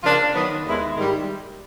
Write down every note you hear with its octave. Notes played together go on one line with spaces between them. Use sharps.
C#3 F3 A#3 D4 F4
D#3 F#3 B3
D#2 D#3 G#3 B3 E4
G#2 D#3 G3